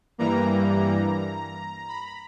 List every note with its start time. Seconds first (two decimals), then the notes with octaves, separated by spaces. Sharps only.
0.18 G2 E3 G3 A#3 A#5
1.88 B5